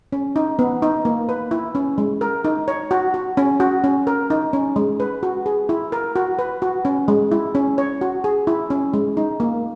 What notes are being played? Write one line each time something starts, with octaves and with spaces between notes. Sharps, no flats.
C#4
D#4
B3
D#4
A#3
B4
E4
C#4
G#3
A#4
D#4
C#5
F#4
F#4
C#4
F#4
C#4
A#4
D#4
C#4
G#3
B4
F#4
G#4
E4
A#4
F#4
B4
F#4
C#4
G#3
E4
C#4
C#5
F#4
G#4
E4
C#4
G#3
D#4
A#3